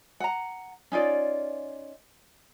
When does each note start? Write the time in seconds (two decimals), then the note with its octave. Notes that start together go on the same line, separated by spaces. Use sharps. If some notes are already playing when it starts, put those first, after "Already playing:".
0.20 F#5 A#5
0.92 C#4 D#4 F4 D5